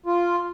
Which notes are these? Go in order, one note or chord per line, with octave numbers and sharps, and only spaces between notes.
F4